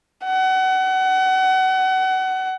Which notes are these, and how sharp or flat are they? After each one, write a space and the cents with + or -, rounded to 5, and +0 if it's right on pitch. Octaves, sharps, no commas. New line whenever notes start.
F#5 +30